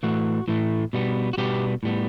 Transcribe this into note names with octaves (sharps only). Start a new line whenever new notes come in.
A2 E3 A3 F#4
A2 E3 A3
B2 G3 B3
F#4
B2 G3 B3 G4
A2 G3 B3